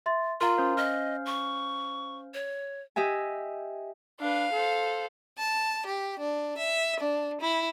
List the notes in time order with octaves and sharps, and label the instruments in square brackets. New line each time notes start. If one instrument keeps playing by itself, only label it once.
[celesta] E5 C6 A6
[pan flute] F4 [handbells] A#4 F5 [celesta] A#5 C6
[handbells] C#4 C5 F5
[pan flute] D#5 [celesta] F6
[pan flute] C#6
C#5
[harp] G4 D#5 E5 G#5
[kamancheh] D4 B4 [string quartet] F5
[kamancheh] A4 C5
[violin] A5
G4
D4
E5
D4
E4